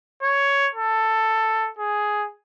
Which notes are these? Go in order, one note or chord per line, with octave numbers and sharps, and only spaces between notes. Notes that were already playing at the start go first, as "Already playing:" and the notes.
C#5
A4
G#4